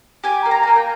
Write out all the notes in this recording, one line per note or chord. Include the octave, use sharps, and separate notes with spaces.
G4 G#5
A#3
A#5
A#3 G#5
G5